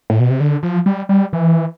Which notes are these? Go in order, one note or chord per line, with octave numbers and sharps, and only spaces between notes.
A2
B2
C3
D3
F3
G3
G3
E3